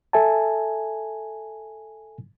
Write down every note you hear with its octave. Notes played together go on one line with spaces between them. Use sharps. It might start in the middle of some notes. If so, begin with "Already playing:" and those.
A4 E5 G#5 A5